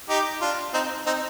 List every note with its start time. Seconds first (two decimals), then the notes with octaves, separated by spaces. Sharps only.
0.09 D#4 G4
0.41 D4 F4
0.74 C4 D#4
1.06 C4 D#4